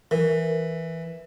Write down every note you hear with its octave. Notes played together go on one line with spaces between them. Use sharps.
E3 A#4